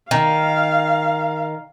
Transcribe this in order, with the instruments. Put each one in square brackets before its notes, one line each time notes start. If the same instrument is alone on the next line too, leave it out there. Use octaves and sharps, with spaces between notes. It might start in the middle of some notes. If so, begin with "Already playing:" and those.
[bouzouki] D#3 [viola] F5